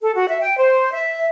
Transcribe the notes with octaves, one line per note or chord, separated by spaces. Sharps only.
A4
F#4
E5
G5
C5
E5